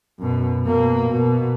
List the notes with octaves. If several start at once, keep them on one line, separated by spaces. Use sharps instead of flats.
F#2 B2
B2 A#3
B2